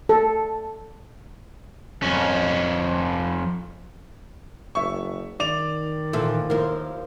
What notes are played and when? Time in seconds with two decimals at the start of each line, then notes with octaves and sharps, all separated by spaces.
0.09 A4
2.02 F2 C#4
4.75 F#1 E5 C#6
5.40 D#3 D5 F7
6.13 A#2 E3 F3 E4 A4
6.50 D#2 F3 E4 A#4